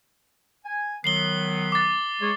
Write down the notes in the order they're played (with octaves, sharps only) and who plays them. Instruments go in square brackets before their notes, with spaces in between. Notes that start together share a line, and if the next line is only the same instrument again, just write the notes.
[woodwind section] G#5
[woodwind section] D#3 F#3 B3 [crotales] C7 F#7 G7
[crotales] D6 A6
[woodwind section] G#3 G#4 C#5